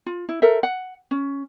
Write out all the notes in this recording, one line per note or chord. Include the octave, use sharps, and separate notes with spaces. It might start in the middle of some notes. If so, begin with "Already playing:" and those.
F4
E4
A4 A#4 C5 E5
F#5
C#4